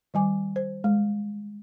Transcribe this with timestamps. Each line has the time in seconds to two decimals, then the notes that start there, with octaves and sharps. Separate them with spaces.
0.14 D#3 G3 G#5 D6
0.56 C5
0.84 G#3